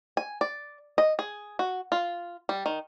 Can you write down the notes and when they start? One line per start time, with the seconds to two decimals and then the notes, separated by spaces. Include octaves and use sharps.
0.17 G#5
0.41 D5
0.98 D#5
1.19 G#4
1.59 F#4
1.92 F4
2.49 G3
2.66 D#3